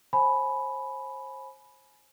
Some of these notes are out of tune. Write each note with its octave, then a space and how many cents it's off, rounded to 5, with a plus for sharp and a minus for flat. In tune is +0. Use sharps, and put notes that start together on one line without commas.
C5 +30 G#5 +25 B5 +0